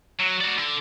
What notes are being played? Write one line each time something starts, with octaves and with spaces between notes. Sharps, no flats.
F#3
F#4 D5
D3